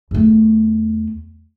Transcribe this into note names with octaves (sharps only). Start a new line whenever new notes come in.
E2 A3